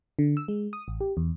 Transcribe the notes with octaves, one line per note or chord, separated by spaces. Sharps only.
D3
E6
G#3
D#6
A1
G4
E2